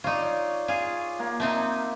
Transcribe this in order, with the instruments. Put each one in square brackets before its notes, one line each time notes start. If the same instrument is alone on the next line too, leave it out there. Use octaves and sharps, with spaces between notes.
[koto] D#4 F4 [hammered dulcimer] C#5 D5
[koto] F4 G#4
[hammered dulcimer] A#3
[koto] A3 C4 D#4